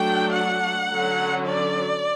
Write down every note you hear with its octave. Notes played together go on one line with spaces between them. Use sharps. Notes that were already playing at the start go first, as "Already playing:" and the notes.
Already playing: F#3 A3 D4 G5
F#5
D3 F#3 C#4
D5